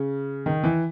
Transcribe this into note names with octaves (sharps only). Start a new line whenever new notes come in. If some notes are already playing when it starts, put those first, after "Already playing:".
Already playing: C#3
D#3
E3